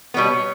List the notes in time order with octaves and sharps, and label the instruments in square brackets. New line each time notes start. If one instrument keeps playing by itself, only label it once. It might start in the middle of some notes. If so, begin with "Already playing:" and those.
[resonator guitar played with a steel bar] B2 G3 B3 [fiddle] C#5